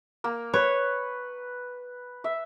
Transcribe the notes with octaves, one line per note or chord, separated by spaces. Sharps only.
A#3
B4 C#5
E5